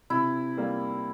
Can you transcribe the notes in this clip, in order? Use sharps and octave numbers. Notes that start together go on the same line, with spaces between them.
C3 E4
G3 A#3